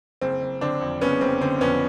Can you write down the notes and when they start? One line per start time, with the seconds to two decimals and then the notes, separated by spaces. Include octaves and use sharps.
0.21 F#1 C4
0.42 F#1
0.61 D3 C4 D4
0.81 F2
1.01 F#1 B3 C#4
1.21 F#1 C4
1.41 D3 C4
1.61 F2 B3 C#4